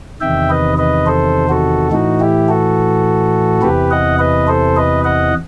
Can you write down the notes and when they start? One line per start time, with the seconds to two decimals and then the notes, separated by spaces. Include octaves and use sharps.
0.21 E2 C3 D#3 E5 G5
0.50 B4 D#5
0.78 B4 D#5
1.06 A4 C5
1.49 F#4 A4
1.92 A2 E3 D#4 F#4
2.20 E4 G4
2.49 F#4 A4
3.62 E2 C3 E3 G4 B4
3.90 D#5 F#5
4.19 B4 D#5
4.47 A4 C5
4.76 B4 D#5
5.04 D#5 F#5